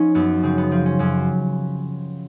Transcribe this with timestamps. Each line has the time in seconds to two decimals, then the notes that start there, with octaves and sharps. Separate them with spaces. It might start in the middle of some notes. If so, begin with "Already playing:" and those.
Already playing: F3 C#4 D#4
0.15 F#2 B3
0.43 C#3 C4
0.58 B3
0.71 F3 C4
0.86 C#4
0.99 F#2 C#4